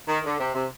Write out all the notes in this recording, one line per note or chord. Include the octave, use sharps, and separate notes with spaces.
D#3
D3
C3
C3